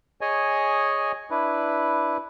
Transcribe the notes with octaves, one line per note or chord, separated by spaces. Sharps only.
G#4 C#5 D#5 G#5
D4 E4 B4